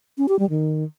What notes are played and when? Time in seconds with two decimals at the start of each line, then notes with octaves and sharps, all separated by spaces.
0.18 C#4
0.29 G4
0.39 G3
0.50 D#3